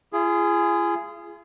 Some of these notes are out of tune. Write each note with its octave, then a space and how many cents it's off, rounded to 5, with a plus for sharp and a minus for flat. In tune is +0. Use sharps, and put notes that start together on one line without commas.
F4 -45 G#4 +0